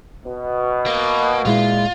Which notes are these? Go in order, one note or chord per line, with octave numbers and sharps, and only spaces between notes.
B2
A#3
A#2 G#3 E4 F4